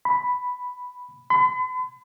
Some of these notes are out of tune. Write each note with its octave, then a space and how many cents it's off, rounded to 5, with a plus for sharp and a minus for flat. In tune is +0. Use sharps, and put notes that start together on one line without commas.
B5 +5
B5 +45